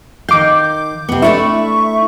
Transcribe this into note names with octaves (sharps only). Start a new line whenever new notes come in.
D#3 F5 D6 G6
C3 B3
A3 D4 E4 E5 C#6